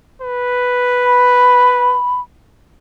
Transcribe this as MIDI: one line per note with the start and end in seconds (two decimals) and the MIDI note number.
0.22 1.96 71
1.05 2.20 83